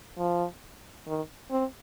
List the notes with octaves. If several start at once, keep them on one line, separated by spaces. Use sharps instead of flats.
F3
D#3
C4